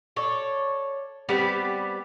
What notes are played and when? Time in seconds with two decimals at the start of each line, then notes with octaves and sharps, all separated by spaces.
0.16 A4 C#5 D5
1.29 G3 B3 C4 G4 D5